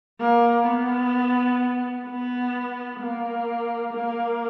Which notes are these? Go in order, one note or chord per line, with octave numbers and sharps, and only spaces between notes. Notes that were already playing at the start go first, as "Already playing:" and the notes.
A#3
B3
B3
A#3
A#3